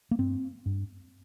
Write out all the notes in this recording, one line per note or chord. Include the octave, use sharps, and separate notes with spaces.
A#3
G2 C4
G2